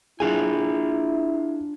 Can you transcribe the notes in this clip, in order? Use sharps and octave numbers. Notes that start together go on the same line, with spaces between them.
D4 E4 F4 G#4 G#5